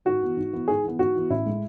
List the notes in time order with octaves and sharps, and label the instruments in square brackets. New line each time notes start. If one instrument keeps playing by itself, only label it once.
[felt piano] G#2 [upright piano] F#4
[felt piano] E3 B3
G#2
E3 B3
[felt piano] G#2 [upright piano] G#4
[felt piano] E3 B3
[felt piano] G#2 [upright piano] F#4
[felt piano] E3 B3
[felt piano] A1 [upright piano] E4
[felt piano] A2 G#3